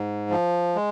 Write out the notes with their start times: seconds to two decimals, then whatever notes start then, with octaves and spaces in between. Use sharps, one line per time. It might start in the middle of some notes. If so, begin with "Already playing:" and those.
Already playing: G#2
0.30 F3
0.75 G#3